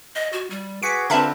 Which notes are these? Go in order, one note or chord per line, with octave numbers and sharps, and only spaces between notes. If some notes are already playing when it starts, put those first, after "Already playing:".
D#5
F#4
G3
F#4 G#4 B4 D6 B6 C#7
D3 C4 F4 A#4 B4 E5 A5 B5